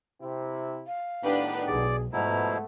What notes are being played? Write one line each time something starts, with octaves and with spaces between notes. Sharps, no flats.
C3 C4 E4
F5
A2 D#3 B3 D4 G4 B4
B1 G#4 D5
G#2 B2 F3 A3 B3 E4 A#5